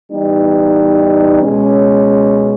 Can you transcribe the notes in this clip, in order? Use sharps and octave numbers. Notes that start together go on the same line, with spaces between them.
E3 G3 B3 D#4
B2 G#3 C#4